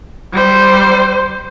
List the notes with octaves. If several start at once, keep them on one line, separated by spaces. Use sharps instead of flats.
G3 C5